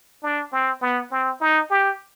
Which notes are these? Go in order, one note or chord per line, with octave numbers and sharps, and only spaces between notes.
D4
C4
B3
C4
D#4
G4